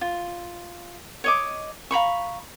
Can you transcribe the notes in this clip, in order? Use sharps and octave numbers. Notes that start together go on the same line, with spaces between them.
F4
C#5 D#5 D6
F5 A#5 B5 C#6